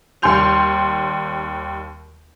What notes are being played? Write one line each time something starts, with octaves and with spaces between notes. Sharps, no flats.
D#2 G3 G5 C6 G6 F7